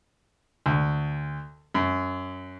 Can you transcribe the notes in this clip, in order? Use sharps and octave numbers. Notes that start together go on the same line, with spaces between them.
D2
F#2